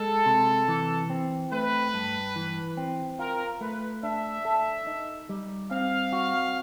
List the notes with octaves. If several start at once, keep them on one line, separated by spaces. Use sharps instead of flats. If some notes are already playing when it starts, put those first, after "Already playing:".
Already playing: G#3 A4
C3
E3
C4
A3 B4
G2
E3
C4
F4 A#4
A3 B4
D4 E5
A4
D#4
G3
C4 F5
F#4